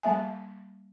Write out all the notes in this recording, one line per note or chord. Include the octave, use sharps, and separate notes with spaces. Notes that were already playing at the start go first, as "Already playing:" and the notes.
G3 A#3 E5 G#5